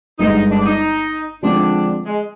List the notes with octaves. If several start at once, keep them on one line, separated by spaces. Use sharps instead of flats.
G1 G2 D3 G#3 D#4
D4
D4
D#4
D3 F3 G#3 C4 D4
G#3